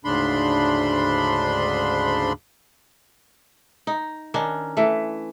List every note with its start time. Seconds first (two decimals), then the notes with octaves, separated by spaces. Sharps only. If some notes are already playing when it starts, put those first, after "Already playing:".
0.05 D2 G#2 C#3 D4 B5 C6
3.87 D#4
4.34 D#3 C#4 D4
4.77 E3 A3